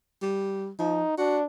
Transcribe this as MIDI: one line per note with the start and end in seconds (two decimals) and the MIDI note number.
0.22 0.71 55
0.79 1.03 53
0.79 1.18 63
1.18 1.44 62
1.18 1.39 66